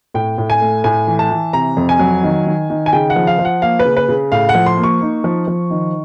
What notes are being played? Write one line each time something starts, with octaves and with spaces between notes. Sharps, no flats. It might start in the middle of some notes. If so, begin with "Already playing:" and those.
A2 G5
A2
G#5
A3
A2 G#5
E3
A5
E3
C3 A#5
F2
G#5
F#3
D#3
D#3
D#3
G#5
C#3 G5
F#5
F3
F5
F3
F#5
A#3 F5
B4
C#3
B4
C#3
A2 F5
F#5
F3
C6
A#3
C#6
D#4
F3
F3
D#3